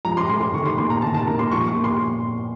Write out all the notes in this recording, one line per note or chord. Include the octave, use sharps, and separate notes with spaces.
F3 A#5
C6
A3 C6
C6
D#3 C#6
C6
A#3 C6
A#5
D#3 A5
A5
A#3 A#5
C6
F3 C#6
C#6
A#3
C6